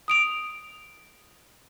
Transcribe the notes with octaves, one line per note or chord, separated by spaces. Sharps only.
D#6 D7 F7